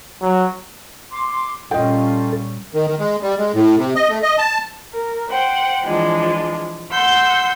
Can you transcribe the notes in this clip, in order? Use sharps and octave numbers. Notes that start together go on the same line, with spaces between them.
F#3
C6 D6
A#2 G3 C#4 F4 A4 D#5 G5
D#3
D#3
G#3
G3
G#3
A2
C3
D#5
A3
D#5
A5
A#4
C5 F#5 G5
E3 F3 G#3 D4
F#5 C6 E6 G6